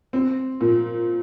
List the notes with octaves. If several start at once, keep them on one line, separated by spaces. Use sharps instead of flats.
C4
A#2